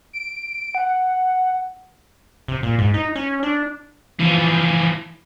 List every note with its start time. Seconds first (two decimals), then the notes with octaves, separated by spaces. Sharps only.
0.13 D7
0.75 F#5
2.48 C3
2.63 A#2
2.78 G#2
2.94 D#4
3.16 C#4
3.43 D4
4.20 E3 F3